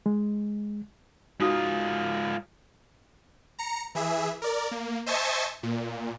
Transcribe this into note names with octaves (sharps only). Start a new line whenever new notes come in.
G#3
G#2 D#4 F4 F#4 D#6
A#5 C#7
E3 G#4 E5
A#4 D5
A#3
C5 D#5 E5 G#5 A5 C#6
A#2